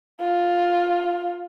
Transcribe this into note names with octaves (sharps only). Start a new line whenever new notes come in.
F4